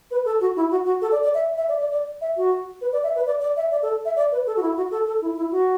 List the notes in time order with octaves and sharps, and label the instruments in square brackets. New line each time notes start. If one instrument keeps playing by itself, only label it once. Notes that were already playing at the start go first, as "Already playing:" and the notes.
[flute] B4
A4
F#4
E4
F#4
F#4
A4
D5
D5
E5
E5
D5
D5
D5
E5
F#4
B4
D5
E5
B4
D5
D5
E5
D5
A4
E5
D5
B4
A4
F#4
E4
F#4
A4
A4
E4
E4
F#4